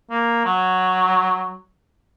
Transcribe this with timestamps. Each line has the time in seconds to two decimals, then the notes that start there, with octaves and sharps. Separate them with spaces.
0.10 A#3
0.45 F#3